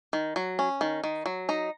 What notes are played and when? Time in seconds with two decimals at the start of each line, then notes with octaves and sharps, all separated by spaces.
0.13 D#3
0.36 F#3
0.59 C#4
0.81 D#3
1.04 D#3
1.26 F#3
1.49 D#4 A#5